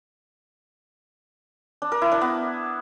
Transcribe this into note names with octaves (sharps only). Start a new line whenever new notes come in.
D4
A#4
E4
D4
B3